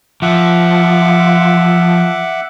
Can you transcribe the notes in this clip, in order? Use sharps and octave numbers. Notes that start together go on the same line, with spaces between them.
F3 E5 F#5 D6